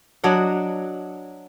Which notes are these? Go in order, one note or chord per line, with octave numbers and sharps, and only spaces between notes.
F#3 D4 D#5 F#5